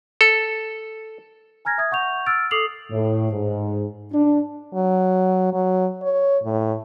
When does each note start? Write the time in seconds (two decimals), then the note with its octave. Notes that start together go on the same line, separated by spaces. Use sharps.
0.21 A4
1.65 G#5 A#5 F6 G#6 A#6
1.78 E5 D#6 G#6
1.92 F#5 C#6 G6 F7
2.26 E6 F6 A6 D7
2.51 A4 D6 D#6 C7 F7 F#7
2.92 A2
3.31 G#2
4.13 D4
4.74 F#3
5.53 F#3
6.02 C#5
6.44 A2